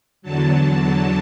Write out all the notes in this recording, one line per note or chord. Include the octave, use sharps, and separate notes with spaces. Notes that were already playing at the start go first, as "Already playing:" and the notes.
E2 D3 F#3 A5
E2 D3 F#3 A5